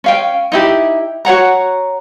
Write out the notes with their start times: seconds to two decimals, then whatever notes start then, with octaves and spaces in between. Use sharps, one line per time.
0.04 C#4 F5 G5
0.52 D#4 E4 G4
1.25 F#4 C#5 F#5 A#5